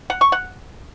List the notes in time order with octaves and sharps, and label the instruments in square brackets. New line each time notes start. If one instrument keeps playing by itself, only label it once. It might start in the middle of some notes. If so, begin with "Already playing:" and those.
[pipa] F#5
C#6
F#5